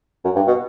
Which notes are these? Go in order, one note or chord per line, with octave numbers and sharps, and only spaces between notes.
F#2
G2
B2